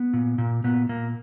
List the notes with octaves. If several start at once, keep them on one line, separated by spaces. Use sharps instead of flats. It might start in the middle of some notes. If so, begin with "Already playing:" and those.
Already playing: B3
A#2
A#2
A#2 B3
A#2 A#3